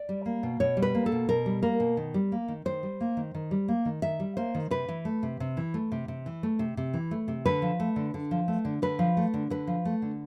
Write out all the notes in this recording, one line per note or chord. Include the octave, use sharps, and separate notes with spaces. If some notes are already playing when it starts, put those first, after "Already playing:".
Already playing: D5
G3
A#3
B2
B2 C#5
G3
B4
A#3
A4
B2
B2 A#4
G3
A#3 A#4
B2
D#3
G3
A#3
D#3
D#3 C5
G3
A#3
D#3
D#3
G3
A#3
D#3
D#3 E5
G3
A#3 C5
D#3
C3 B4
E3
A3
C3
C3
E3
A3
C3
C3
E3
A3
C3
C3
E3
A3
C3
D3 B4
F3
A3
D3
D3
F3
A3
D3
D3 B4
F3
A3
D3
D3 B4
F3
A3
D3